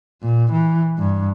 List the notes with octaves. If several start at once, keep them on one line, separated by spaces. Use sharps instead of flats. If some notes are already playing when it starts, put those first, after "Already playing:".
A#2
E3
G2